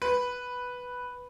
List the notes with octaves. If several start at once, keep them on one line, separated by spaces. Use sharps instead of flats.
B4